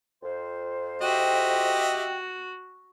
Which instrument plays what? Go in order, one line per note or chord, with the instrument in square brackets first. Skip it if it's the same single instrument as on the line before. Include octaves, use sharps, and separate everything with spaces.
[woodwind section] F2 C5
[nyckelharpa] F#4 [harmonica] G4 D#5 E5 [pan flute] G5